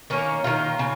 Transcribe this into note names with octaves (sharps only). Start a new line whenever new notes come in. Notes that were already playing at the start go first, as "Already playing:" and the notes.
D#3 A#3 C#4
D#3 A#3 F4
C#3